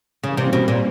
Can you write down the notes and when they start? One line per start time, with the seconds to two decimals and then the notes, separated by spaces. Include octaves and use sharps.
0.23 C#3 E3 G3 A#3 C#4
0.37 C3
0.53 B2
0.68 A#2